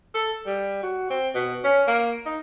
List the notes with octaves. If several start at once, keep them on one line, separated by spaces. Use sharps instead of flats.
A4
G3
F#4
C4
B2
C#4
A#3
D#4